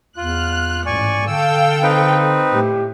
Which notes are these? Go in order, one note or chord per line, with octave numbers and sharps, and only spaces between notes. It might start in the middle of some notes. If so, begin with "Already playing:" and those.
E2 F4 F6 F#6
A1 G#2 D5 G#5 C#6
D3 A4 F5 G5 E6
C4 D#4 B4
A2 G4